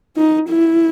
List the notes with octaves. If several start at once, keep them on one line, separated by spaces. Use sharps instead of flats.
D#4
E4